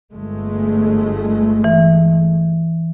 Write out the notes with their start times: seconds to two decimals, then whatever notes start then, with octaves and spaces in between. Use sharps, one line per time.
0.12 G1 G#3 A3
1.64 E3